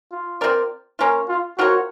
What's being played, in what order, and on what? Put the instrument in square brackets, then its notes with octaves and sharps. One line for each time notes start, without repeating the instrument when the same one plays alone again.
[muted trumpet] F4
[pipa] C4 F4 A#4 D5
A#3 C#4 F4
[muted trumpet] F4
[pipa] C4 F4 A#4 C#5 [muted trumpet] F#4